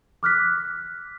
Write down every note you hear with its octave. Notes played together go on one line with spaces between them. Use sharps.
D6 F6 F#6 B6